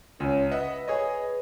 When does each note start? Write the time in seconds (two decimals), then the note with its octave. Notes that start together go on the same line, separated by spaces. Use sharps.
0.20 C#2 C#4
0.51 B4 D#5 E5 F#5
0.88 G#4 C#5 D#5